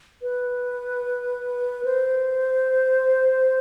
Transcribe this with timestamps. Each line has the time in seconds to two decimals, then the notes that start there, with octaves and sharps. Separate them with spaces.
0.22 B4
1.85 C5